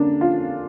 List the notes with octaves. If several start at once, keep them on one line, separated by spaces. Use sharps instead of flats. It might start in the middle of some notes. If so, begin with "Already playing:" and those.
Already playing: D3 A#3 C#4 D4
F4